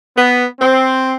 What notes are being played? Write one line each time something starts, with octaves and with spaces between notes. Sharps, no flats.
B3
C4